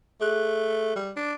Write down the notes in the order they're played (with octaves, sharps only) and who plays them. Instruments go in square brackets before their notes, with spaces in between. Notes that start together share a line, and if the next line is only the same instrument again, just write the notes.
[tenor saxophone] A3 [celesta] G#4 F#6
[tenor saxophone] G3
D4